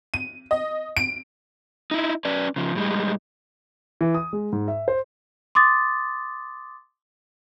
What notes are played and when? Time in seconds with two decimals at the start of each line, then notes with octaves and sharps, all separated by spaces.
0.14 D#7
0.51 D#5
0.97 D7
1.91 D#4 E4
2.25 C#4 B4 D5
2.56 C#3 F3
2.75 A2 G3 G#3
4.01 E3
4.15 D#6
4.33 G#3
4.52 G#2
4.68 E5
4.88 C5
5.55 C6 D6 D#6 A6